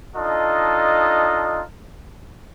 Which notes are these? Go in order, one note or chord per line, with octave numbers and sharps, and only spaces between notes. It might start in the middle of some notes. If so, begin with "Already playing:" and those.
D4 D#4 F4 A4 D#5